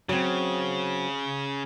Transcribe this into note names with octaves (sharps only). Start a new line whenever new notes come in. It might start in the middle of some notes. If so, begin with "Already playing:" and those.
C#3 F#3 C4